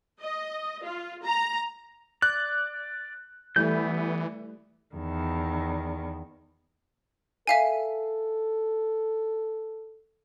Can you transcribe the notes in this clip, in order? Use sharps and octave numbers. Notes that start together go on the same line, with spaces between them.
D#5
F4
A#5
D5 F#6
E3 G3 A3 B3 E4 G6
E2 D#3
A4 E5 F5 G#5